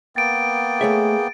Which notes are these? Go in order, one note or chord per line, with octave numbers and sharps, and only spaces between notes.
A#3 B3 G5 A6 D7
A3 G#4 C#5 E5